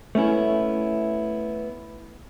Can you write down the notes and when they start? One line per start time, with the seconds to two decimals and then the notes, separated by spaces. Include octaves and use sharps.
0.15 A3 B3 C#4 E4